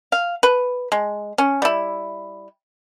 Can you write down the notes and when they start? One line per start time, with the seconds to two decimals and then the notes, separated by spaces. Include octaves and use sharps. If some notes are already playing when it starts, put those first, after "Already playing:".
0.12 F5
0.43 B4
0.92 G#3
1.38 C#4
1.62 G3 E4